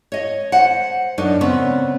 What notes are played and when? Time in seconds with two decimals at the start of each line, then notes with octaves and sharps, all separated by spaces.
0.12 C#5 D#5
0.52 C5 F#5
1.18 F#2 D4 D#4
1.41 C#3 B3 C4